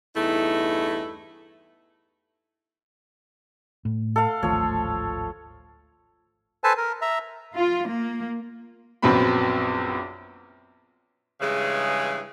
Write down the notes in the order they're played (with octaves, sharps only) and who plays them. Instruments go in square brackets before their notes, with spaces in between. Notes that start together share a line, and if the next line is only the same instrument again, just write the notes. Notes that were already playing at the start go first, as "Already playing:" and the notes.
[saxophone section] E2 G2 A3 D#4 E4
[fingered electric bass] A2
[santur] A4 F5
[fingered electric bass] D1 G#1 A3 [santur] F3 C#5
[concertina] A4 B4 C5 G#5 A5
A#4
E5 A#5
[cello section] F4
A#3
[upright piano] A#1 F#2 B3 C4 B5
[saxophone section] G2 C#3 E3 G#3